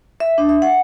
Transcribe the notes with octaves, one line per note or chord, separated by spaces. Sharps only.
E5
D4
E5
F#5